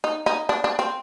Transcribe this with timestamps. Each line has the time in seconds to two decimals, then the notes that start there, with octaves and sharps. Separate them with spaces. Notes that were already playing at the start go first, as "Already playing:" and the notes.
0.04 D#4
0.26 D#4
0.49 D4
0.64 D4
0.79 C4